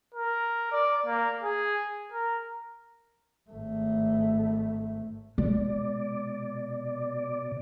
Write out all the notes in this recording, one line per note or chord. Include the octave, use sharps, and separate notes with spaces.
A#4
D5
A#3
G#4
A#4
G#1 A3
B2 G#3 D5